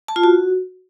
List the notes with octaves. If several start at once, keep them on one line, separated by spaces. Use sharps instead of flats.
A5
F4
F#4